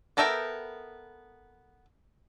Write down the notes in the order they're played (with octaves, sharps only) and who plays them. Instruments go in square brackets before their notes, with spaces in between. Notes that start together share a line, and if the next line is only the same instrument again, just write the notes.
[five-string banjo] B3 A4 A#4 E5 G5